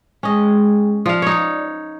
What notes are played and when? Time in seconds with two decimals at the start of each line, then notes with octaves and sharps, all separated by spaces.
0.23 G#3 C#4 G#4 D#5 G5
1.06 F3 D5 F5
1.22 D#4 C#5